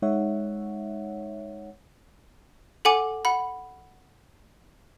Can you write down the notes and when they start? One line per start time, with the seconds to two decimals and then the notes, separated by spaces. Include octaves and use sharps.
0.02 G#3 D#4 C#5 E5 F#5
2.85 A4 F#5 G#5 D6
3.25 F#5 B5